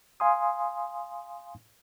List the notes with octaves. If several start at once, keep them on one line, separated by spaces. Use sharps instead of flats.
F5 G#5 C6 D#6